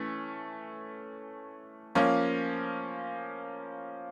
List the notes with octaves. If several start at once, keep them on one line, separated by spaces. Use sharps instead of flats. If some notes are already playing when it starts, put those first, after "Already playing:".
Already playing: E3 A3 C#4
F3 A#3 C#4